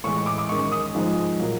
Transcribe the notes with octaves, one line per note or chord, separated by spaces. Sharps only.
A2 E3 G#3 C#6
D6
D6
F#2 D#3 G#3 C#6
D#6
G#2 F3 G#3
A#2 F#3